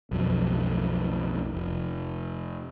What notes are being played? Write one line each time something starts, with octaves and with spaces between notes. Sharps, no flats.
B1 F2 F#3
F1